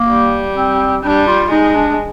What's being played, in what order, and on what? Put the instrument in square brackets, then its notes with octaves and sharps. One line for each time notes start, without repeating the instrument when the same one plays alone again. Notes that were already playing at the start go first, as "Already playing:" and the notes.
Already playing: [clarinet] A#3
[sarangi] G3
[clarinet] C4
[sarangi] G3 [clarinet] D4
[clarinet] F4
[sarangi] G#3 [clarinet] D#4
[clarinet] D4